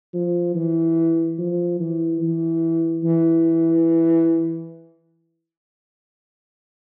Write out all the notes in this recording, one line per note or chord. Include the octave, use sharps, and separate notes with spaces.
F3
E3
F3
E3
E3
E3